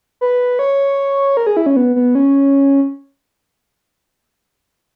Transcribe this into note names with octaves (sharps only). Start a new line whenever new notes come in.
B4
C#5
A#4
G#4
E4
C#4
B3
B3
C#4